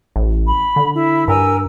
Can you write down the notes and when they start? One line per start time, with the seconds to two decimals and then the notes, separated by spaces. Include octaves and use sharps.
0.16 A1
0.46 B5
0.76 D3
0.93 E4
1.28 G2 A#4 G#5 E6